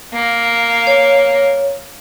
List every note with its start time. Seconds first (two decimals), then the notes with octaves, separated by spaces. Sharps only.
0.14 A#3
0.87 C#5